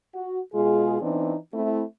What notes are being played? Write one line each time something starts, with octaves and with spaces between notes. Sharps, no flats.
F#4
B2 G#3 F4 G#4
E3 B3 C4 D4 D#4
A3 C4 E4